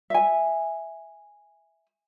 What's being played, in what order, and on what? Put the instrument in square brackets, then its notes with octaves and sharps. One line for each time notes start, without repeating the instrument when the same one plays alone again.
[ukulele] E5 G#5